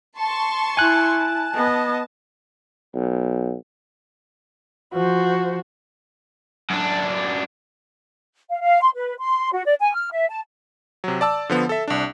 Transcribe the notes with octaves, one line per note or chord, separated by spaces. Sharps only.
A5 C6 C#6
E4 G#5 F#6
A5
B3 D#5
B1
F3 F#4 C5
F#2 D4
F5
F5
C6
B4
C6
F#4
D5
G#5
F6
E5
A5
C3 F#3
D5 A5 E6
D3 F3 B3
A4 E5
C2 D4